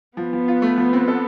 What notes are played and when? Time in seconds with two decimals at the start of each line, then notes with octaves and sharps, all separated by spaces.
0.17 F3 B3
0.33 F3
0.48 F4
0.62 A3
0.77 F3
0.93 C4
1.08 A4